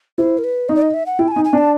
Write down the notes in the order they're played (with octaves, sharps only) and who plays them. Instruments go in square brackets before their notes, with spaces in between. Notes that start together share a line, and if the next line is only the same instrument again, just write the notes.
[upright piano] E4 [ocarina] C5
[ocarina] A#4
B4
[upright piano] D#4 [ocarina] D#5
[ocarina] D5
D#5
E5
F#5
[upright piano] E4 [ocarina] G5
[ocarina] A5
G#5
[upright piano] D#4
[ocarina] G#5
[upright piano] D4 [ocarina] A5